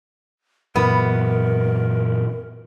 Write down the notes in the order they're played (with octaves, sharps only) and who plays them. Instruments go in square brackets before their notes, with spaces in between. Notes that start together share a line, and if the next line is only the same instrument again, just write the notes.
[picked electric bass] F#2 E3 [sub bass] A#2 [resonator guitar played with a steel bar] B3 [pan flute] A#4